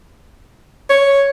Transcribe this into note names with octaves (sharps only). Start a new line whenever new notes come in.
C#5